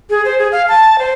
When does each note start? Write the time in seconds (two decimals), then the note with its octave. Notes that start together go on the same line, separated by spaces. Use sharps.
0.10 G#4
0.25 C5
0.38 G#4
0.52 F5
0.68 A5
0.99 C5